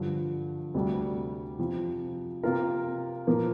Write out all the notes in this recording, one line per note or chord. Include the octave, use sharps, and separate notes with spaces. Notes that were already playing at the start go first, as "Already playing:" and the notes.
Already playing: G2 D3 F3
D2 C3 G3 D4 G4
F2 C3 F3
C3 A#3 F4 A#4
A#2 F3 A#3